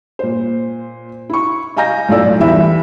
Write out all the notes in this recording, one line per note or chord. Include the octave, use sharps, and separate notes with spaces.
A#2 C5
E4 C#6
D#5 F5 G#5 A#5 G6 A#6
B1 A2 F4 A4 D5 E6
E2 E3 G3 E5 B5